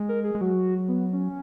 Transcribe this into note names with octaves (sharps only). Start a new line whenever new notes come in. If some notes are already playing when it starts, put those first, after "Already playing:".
Already playing: G#3
A#4
G#4
G#3
F#3 F#4
B3
C#4